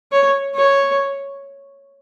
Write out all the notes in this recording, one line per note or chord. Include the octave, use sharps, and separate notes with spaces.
C#5
C#5